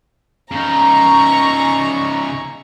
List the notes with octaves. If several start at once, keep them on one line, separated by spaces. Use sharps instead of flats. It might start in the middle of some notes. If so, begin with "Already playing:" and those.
C#3 D#4 A#5 C#6